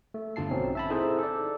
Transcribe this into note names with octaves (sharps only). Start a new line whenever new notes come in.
A3
G1 D3 F4 A5 C7
A#1 B2 C4 C#4 D#4
E5 A5 B5
C4 D#4 E4 G#4 A4 C5
A4 D5